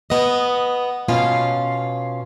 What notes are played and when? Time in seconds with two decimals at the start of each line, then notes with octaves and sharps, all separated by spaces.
0.10 B3 D#5
1.08 B2 C#4 F4 F5